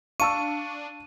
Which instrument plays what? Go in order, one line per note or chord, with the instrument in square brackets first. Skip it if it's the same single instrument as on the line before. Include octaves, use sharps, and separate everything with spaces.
[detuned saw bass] D4 [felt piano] F5 A5 E6 [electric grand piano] C#6 [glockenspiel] D#7